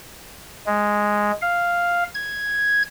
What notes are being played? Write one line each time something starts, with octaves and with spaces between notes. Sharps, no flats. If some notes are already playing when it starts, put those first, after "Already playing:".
G#3
F5
G#6